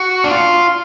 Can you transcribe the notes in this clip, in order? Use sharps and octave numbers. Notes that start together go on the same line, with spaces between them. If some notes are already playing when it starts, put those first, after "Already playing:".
Already playing: F#4
D4
F4